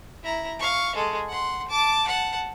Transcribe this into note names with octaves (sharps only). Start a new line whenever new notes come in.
E4 A#5
F5 C#6
G#3 A4
F#5 C6
A5 D6
F#5 A5